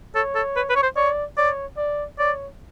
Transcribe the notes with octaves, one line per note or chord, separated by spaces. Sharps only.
A4 C#5
A4
B4
B4
C#5
C5
C#5 D5
C#5 D5
D5
C#5 D5